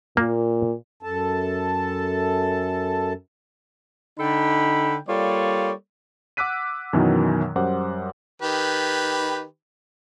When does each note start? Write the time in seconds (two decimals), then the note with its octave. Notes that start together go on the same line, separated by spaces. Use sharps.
0.17 A#2 A#3
1.03 F#2 A4 A5
4.19 D3 D#4 A4 G5 B5
5.08 G3 A#3 F4 A4 C#5 D5
6.37 F#5 D6 E6 F#6 B6 D#7
6.93 F#2 B2 D#3 E3 F#3
7.56 F#2 G3 C5 F#5 D6
8.42 D#3 G4 B4